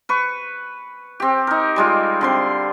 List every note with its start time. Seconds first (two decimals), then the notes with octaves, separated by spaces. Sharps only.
0.09 B4 C#6
1.20 C4 G4
1.47 D#4 A#4
1.76 G3 G#3 F4
2.21 D3 C4 C6